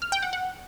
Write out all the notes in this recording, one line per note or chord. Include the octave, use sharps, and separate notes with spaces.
F6
G5
F#5
F#5